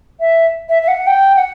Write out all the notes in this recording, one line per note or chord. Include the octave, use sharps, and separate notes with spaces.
E5
E5
E5
F#5
G5
F#5